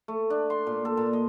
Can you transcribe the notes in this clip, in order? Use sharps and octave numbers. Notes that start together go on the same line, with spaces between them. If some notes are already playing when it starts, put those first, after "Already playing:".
A3
D4
C6
A#2
A4
A#2
D#5